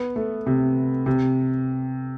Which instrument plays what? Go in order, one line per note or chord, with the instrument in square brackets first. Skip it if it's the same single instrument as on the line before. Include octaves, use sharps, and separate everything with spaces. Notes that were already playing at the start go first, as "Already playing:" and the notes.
Already playing: [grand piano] B3
A3
C3
C3